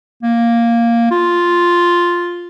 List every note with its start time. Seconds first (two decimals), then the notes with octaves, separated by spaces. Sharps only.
0.23 A#3
1.11 F4